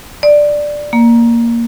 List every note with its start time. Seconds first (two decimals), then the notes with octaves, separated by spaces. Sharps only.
0.23 D5
0.93 A#3